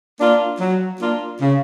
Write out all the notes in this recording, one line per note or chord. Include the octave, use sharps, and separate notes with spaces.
A#3 D4 F4
F#3
A#3 D4 F4
C#3